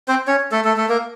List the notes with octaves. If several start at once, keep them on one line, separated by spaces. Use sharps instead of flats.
C4 C5
C#4 C#5
A3 A4
A3 A4
A3 A4
A#3 A#4